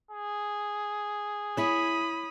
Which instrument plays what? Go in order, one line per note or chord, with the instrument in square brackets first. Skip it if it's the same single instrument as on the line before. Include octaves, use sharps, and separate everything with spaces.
[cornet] G#4
[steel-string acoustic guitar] E4 C#5 [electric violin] B5 D#6